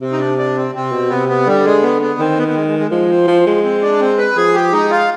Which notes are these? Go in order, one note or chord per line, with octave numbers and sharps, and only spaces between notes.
C3 C4
D#4
D4
D4
C4
C3 C4
B2
C3 B3
B3
D3 G3
G#3
B3
B3
D#3 C4
B3
B3
G#3
G#3
G#3
F3 G#3
C4
F3
G#3
C4
D4
C4
B4
F3 G#4
G4
G#3 D#4
F4